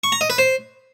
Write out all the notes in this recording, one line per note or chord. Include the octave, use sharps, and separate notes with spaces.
C#6
A#5
D#5
B4
C5